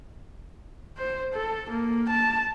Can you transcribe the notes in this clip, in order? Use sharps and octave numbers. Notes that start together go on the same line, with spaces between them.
C5
A4
A#3
A5